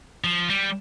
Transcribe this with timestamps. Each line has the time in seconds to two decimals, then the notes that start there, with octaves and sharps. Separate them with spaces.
0.24 F3
0.50 G3